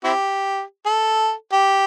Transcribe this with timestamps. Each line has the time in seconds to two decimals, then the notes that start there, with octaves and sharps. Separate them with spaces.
0.04 C4 E4 G4
0.86 A4
1.52 G4